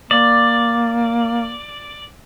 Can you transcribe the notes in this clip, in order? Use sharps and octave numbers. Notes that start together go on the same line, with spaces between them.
A#3 D5